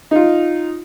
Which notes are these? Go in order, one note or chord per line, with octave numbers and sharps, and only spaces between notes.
D#4 F4